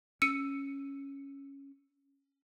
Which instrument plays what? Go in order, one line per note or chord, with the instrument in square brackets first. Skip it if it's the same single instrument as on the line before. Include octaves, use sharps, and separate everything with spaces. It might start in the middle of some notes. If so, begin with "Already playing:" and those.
[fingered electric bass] C#4 [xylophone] E6 C#7 D#7